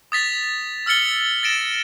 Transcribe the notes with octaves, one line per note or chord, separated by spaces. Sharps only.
D#6 A6 B6 F7
E6 F6 A6 C#7 G7
A6 A#6 D7 E7